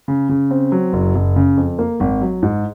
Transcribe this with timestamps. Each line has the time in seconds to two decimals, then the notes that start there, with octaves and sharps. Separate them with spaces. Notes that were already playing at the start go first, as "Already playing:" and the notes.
0.08 C#3
0.29 C#3
0.51 C4
0.72 F#3
0.93 F#1
1.15 F#1
1.36 C#3
1.57 F2
1.79 A#3
2.00 G#1
2.21 F#3
2.43 G#2